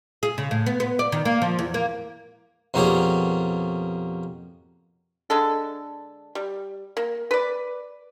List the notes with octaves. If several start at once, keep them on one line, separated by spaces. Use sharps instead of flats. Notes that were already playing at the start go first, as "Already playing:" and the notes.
G#4
C#3
A2
B3
B3
D5
D#3
A#3
F3
E2
A#3
F2 B2 A#3 C#4 G4 G#4
D3 G#3 A4
G3
A#3
B4 D5